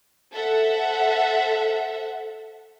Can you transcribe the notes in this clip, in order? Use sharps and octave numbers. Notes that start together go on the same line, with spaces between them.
A4 C5 E5 F#5